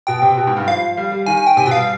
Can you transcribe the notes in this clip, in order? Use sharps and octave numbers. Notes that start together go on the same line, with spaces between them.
B2 G5
C3
B2
G#2
G2
F3 F5
G3
G3
D#3 G#5
G#5
G5
C3 G#5
B2 G5
G3 F5